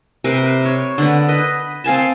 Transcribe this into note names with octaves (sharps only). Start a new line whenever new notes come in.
C3 A#4 B4
C#5
D3 B3
B4 D#5
C4 F5 G#5 A5